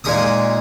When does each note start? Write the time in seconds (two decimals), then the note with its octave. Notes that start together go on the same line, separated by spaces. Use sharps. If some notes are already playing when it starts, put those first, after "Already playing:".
0.04 A#2 G#3 D#4 D#5 D#6